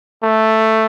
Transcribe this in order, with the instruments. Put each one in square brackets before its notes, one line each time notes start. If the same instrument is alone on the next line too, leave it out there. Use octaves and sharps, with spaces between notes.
[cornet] A3